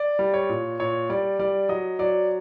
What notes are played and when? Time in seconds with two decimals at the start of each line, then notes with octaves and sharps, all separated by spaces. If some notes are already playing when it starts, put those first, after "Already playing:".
Already playing: D5
0.19 G3
0.34 C#5
0.49 A#2
0.79 A#2 C#5
1.09 G3 D5
1.39 G3 D5
1.69 F#3 D#5
1.99 F#3 D5